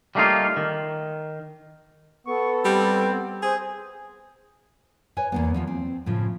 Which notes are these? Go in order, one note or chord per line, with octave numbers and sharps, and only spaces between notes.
G3 A3 A#3 C4 D#4 F4
D#3
B3 A4 C#6
G3 C4
G#4 C5 D#6
B4 C#5 G#5
E2 A#3 B3
E2 F3 F4
C4
A2 C#3 F3